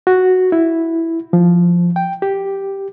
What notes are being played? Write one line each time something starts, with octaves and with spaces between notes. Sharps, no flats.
F#4
E4
F3
G5
G4